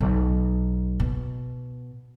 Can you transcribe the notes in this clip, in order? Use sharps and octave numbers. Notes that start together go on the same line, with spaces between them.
B1
B2